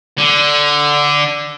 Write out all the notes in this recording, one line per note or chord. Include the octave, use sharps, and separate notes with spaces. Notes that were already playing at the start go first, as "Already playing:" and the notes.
D3